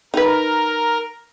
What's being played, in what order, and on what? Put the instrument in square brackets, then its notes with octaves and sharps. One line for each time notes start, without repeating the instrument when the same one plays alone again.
[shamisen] D#4 B4 [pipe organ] A#4